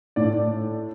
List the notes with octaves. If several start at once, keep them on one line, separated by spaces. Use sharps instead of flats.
A2 D5